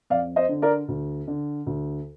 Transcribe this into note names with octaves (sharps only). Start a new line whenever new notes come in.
F2 D5 F5
C5 D#5
D3
A#4 D5
D2
D3
D2